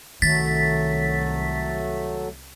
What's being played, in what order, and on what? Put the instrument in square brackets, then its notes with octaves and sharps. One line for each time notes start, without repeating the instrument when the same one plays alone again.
[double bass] C2 [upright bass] D#3 [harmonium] F#3 A3 [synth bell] A6 B6